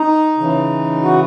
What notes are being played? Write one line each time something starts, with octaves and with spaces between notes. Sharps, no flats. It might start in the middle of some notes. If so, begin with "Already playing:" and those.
Already playing: D#4
C#3 E3
F#4